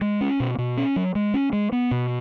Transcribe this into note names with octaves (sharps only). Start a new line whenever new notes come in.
G#3
C#4
B2
B2
C#4
F#3
G#3
C#4
G#3
B3
B2